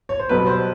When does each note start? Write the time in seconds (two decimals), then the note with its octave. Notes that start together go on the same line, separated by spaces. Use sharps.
0.09 C#5
0.19 C5
0.29 B1 B2 G3 B3 B4
0.47 C5